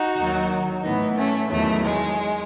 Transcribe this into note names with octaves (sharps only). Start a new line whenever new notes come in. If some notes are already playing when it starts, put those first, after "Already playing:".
Already playing: D#4 F#4
D#2 D#3 F#3
A2 E3 B3 D#4
A3 C#4
E2 D#3 F#3 A3
G#3